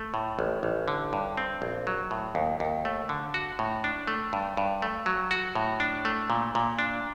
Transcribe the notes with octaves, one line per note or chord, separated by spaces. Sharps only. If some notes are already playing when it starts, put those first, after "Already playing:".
Already playing: A3
A2
A1
A1
D3
G2
C4
A#1
F#3
A2
D#2
D#2
A3
D3
F#4
A2
D4
A3
G2
G2
A3
F#3
F#4
A2
D4
A3
A#2
A#2
D4